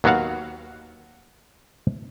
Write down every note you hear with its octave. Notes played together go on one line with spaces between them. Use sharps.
D#2 F#3 B3 F#4 F5 F#5